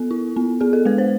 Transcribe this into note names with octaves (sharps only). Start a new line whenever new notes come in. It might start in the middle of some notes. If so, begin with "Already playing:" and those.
Already playing: B3 A4
E4
B3
B3 G#4
A4
G#3 B4
C5